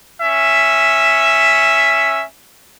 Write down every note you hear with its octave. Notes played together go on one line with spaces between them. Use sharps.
C#4 E5